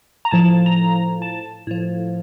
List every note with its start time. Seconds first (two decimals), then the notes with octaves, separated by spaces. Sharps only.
0.25 A#5
0.31 A2 F3 A5
0.66 A#5
1.22 A5
1.67 A2 F3